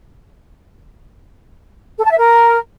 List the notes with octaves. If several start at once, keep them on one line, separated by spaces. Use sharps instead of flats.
A4
A5
E5
A#4